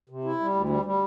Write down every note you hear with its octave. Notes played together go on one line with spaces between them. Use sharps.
C3
E4
G3
D2
G3
G3